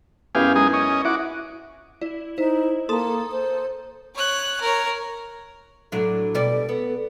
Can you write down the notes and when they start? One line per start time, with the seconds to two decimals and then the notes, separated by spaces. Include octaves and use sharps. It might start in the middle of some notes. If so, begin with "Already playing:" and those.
0.35 F#2 B3 E4 G4 G#4 F5
0.55 G#3 D#4 G#4
0.73 C#4 D#5
1.05 E4 F#4 D6
2.01 E4 D5
2.38 D#4 E4 C5
2.89 A#3 A4 A#5 C6 D#6
3.32 C5
4.15 C#5 F#6
4.61 A#4 C#5
5.92 A2 F#3 D4 A4
6.34 B2 G3 D5
6.69 B3